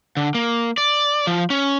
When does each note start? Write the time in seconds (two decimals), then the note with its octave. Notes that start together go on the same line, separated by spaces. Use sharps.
0.17 D3
0.35 A#3
0.78 D5
1.27 F3
1.50 C#4